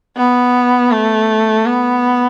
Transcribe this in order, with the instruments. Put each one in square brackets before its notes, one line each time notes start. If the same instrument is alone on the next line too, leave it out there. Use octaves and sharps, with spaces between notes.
[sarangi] B3
A3
B3